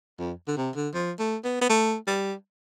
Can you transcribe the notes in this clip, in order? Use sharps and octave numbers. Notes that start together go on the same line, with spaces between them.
F2
D3
C3
D3
F3
A3
B3
B3
A3
G3